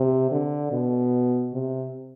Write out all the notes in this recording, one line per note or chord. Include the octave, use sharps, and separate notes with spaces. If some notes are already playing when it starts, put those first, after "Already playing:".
Already playing: C3
D3
B2
C3